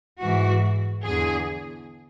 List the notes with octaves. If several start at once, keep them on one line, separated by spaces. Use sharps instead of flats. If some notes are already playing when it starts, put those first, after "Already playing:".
G#2 E3 F#4
E2 D3 G#4